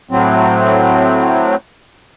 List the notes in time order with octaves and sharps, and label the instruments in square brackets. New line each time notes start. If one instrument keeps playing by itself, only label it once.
[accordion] A2 F#3 C4